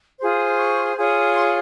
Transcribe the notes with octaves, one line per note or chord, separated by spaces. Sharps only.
F4 G#4 C5
C#6
F4 G#4 C#5
C6